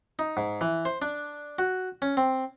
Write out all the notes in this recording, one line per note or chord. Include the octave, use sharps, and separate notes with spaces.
D#4
G#2
E3
C5
D4
F#4
C#4
C4